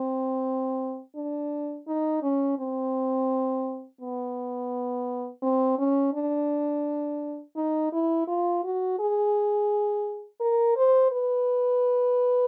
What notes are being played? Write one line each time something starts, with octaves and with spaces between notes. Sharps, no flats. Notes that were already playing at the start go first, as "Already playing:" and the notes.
Already playing: C4
D4
D#4
C#4
C4
B3
C4
C#4
D4
D#4
E4
F4
F#4
G#4
A#4
C5
B4